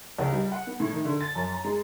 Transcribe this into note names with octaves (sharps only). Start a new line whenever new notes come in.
C#2
G3
F#5
B3
A2
D#3
D3
A6
F#2
A#5
G#3